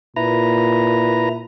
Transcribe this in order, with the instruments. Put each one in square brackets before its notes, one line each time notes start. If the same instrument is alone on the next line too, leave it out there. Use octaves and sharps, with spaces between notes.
[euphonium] A#2 [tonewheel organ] E4 B4 A#5